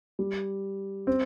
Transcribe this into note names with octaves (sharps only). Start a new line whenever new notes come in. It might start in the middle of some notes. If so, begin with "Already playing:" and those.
G3
C4